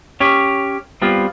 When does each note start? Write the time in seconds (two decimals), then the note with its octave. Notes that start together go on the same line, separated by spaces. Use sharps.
0.20 C#4 G4 C#5
1.02 G3 B3 C4 F4